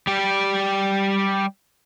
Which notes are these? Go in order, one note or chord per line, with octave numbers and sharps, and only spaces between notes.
G3 G4